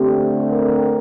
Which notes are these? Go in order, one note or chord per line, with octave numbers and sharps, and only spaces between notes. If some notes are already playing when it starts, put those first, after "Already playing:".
Already playing: D3 A3 C4 G4
A#4